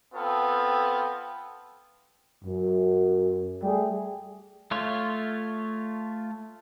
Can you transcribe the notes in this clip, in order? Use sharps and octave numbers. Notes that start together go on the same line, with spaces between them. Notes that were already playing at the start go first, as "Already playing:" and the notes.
B3 C4 F4 A4
F#2
G3 A3 G4 G#4
A3 F4 C#5